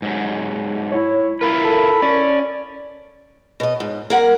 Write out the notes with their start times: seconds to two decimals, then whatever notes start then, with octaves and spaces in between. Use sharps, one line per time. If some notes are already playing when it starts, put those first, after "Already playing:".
0.02 G#2 F#3
0.92 E4 C#5
1.41 E4 F4 A#4 B4 B5
1.65 A4
2.02 C#4 D5
3.60 B2 D#5
3.80 G#2
4.10 A#3 A#4 F#5